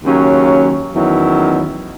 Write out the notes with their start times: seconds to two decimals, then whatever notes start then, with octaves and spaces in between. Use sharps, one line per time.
0.05 D#2 C#3 F#3 C#4
0.94 E2 D#3 F#3 C#4 E4